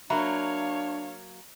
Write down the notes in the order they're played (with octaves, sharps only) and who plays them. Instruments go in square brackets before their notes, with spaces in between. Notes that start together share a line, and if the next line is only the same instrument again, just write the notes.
[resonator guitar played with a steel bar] F#3 A#3 [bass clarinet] D4 [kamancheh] C#5 F5 [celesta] E5 A#5 B5